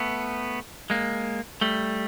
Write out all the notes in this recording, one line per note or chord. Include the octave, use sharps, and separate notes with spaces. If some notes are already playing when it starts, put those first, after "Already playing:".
Already playing: A3 B3
G#3 A#3
G3 A3